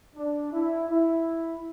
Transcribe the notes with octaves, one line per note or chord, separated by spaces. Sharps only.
D4
E4
E4